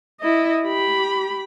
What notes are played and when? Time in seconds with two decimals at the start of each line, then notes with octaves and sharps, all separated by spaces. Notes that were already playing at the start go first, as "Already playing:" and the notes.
0.20 E4 D#5
0.64 G4 B5